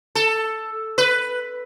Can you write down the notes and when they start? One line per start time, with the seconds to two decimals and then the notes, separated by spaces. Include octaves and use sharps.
0.15 A4
0.98 B4